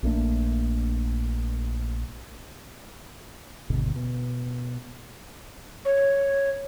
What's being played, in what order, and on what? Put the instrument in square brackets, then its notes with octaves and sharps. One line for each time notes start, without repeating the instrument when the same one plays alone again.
[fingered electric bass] A#1 A3 A#3 D4
G1 D#2 B2 D3
B2
[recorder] C#5